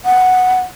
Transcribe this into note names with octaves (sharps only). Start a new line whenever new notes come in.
F#5